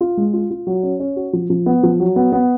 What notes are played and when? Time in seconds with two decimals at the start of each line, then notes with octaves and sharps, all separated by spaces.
0.01 F4
0.17 G#3
0.33 F4
0.50 F4
0.67 F#3
0.83 C#4
1.00 C#4
1.16 F#4
1.33 F3
1.50 F3
1.66 B3
1.83 F3
2.00 F#3
2.16 B3
2.32 B3